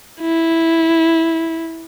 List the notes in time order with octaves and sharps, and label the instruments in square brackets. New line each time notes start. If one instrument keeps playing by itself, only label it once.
[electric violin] E4